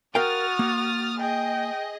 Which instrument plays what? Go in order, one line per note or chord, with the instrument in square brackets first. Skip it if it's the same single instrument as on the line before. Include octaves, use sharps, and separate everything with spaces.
[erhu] F#4 [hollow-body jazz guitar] A#4 F5 G5 [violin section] D#6 F6 A6
[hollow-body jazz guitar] A#3
[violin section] G#4 D#5 [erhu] G5